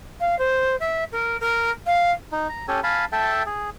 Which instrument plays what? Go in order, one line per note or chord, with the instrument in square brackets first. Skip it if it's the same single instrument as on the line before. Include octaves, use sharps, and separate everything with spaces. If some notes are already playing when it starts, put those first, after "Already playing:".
[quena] F5
C5
E5
A#4
A#4
F5
[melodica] D#4
A#5
C#4 G4 A4 G#5
F5 G#5 A5 B5
A4 E5 G5 A5
G#4